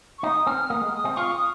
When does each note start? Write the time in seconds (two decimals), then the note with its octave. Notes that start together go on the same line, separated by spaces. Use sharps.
0.18 C#6
0.23 D#4 D#6
0.47 C4 F6
0.70 A#3 D#6
0.82 G#3
0.93 D#6
1.05 C4
1.17 F4 C#6
1.32 D#6